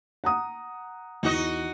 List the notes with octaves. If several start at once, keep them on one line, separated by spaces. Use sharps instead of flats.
F#5 A#5 D#6
E2 D#4 F#4 D#5